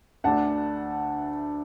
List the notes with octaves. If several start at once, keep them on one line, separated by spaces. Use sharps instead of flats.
D2 D3 A3 D4 F#5 A5